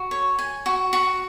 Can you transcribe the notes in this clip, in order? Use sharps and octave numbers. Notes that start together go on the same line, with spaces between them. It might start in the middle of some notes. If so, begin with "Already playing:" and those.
Already playing: F#4
C#5
G#5
F#4
F#4